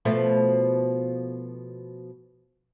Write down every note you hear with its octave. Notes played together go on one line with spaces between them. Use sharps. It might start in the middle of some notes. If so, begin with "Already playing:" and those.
B2 F3 A3